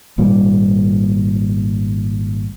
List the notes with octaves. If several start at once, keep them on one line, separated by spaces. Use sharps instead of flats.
G#1 A#2 G3 A#3